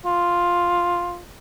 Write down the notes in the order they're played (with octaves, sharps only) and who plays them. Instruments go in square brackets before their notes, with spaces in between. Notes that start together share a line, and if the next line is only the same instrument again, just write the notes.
[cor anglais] F4